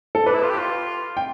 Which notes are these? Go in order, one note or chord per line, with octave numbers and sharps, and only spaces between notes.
A4
D4 B4
E4
F4
G4
F4
G5